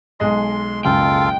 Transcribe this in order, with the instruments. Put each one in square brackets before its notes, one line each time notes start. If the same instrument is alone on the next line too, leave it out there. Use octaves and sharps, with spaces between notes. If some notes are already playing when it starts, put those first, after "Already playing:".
[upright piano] B1 G#3 D#5 [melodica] C6
[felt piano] F#1 C#2 F#2 [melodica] F4 A4 F5 [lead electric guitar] G5